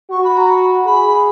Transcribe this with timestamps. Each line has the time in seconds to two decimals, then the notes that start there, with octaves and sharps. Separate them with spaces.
0.11 F#4 C#6
0.24 B5
0.37 A#5
0.50 B5
0.86 G#4 B5